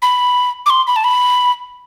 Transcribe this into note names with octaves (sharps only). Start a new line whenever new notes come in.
B5
D6
C6
B5
A5
B5